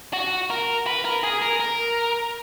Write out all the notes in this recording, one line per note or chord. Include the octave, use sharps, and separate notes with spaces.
F#4
A#4
B4
A#4
G#4
A#4
A#4